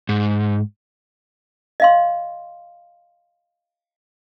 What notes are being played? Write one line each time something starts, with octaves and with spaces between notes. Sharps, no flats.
G#2
D#5 F5 C6